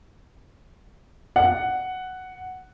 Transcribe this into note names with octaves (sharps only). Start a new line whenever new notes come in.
F#5